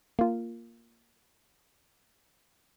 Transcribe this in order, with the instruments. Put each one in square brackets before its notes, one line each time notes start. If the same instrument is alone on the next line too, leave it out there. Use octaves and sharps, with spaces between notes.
[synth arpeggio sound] A#3 F4